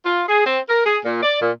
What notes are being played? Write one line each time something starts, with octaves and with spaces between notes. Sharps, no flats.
F4
G#4
C4
A#4
G#4
A#2
D5
A#2